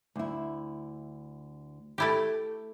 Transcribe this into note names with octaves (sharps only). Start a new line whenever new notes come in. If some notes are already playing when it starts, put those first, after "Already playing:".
D2 E4
A3 E4 G4